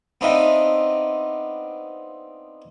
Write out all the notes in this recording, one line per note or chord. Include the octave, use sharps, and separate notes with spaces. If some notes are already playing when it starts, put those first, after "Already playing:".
B3 C4 D4 D#4 F4 E5